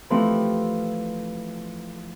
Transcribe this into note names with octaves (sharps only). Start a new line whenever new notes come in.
E3 F3 A3 C4 G4